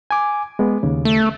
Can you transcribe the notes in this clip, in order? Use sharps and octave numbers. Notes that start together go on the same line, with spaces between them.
G#5 D6
G#3 B3
D#2 C#3
A3